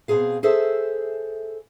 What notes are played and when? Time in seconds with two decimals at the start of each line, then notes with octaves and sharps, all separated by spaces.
0.08 B2 D#3 C4 G#4 F5
0.43 G#4 A4 C5 E5